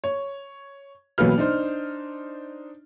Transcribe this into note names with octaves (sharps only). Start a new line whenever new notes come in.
C#5
A1 B2 F#3 A#3 B4 F6
D4 D#4 C5